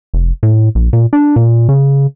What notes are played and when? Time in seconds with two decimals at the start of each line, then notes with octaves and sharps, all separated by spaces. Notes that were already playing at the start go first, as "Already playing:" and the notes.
0.14 F1
0.43 A2
0.75 A#1
0.93 A#2
1.13 D4
1.36 A#2
1.69 C#3